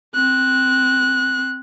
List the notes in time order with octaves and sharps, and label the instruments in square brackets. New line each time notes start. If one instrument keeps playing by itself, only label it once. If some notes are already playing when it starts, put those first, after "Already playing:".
[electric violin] C4 F#6